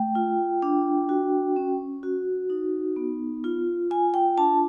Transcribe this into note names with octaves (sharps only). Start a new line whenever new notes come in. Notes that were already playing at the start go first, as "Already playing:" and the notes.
Already playing: A3 G5
F4
D4
F#4
C#4
F#4
D#4
B3
F4
F4 G#5
G5
D4 A5